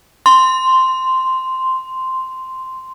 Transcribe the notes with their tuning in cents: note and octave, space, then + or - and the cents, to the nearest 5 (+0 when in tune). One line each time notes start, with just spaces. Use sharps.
C6 -5